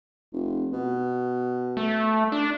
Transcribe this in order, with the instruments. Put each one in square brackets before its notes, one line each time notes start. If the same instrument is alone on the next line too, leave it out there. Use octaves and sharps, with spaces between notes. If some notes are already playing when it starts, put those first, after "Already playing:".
[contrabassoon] F1
B2
[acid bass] A3
D4